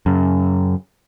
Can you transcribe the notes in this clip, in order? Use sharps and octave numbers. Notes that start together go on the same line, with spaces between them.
F#2 C#3